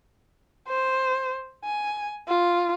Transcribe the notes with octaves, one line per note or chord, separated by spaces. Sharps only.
C5
G#5
F4